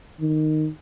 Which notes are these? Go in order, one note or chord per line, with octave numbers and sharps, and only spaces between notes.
D#3